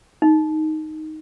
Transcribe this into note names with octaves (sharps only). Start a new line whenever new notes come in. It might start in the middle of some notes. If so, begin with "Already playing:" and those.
D#4